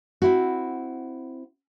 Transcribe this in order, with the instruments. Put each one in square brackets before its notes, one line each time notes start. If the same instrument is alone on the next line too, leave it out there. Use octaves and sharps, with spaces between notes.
[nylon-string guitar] C4 E4 F#4